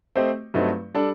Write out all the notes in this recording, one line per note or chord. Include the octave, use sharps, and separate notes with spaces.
A3 C4 G4 C5 D#5
G2 F#3 A3 C4 D#4
G3 D4 A4 D5